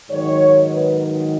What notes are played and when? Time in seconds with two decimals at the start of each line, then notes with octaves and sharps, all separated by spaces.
0.11 G#2 D#3 F#3 C#5
0.72 B4